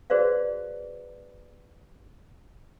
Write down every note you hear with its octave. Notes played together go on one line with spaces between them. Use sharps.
F#4 G#4 B4 C5 D5 F5